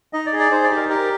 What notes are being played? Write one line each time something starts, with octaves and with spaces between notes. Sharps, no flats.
D#4 D#5
D5
G#4
D5
D#4 C5
D5
G4
A#4
G4 A#4